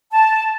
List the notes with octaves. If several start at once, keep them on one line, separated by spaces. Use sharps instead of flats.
A5